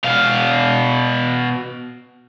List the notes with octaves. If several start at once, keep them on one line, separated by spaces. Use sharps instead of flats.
B2 F5